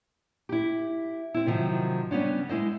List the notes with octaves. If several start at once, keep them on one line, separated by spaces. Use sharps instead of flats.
E4 G4
C4 E4
C3 D#3 F3 F#3
C#3 G3 B3 C#4 D4
G#3 E4 C5 D#5